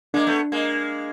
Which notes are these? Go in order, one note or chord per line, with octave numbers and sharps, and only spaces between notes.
G#3 A#3 D4
A3 B3
G#3 A#3